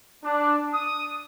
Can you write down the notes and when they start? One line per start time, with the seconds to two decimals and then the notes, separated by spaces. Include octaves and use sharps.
0.24 D4
0.74 D#6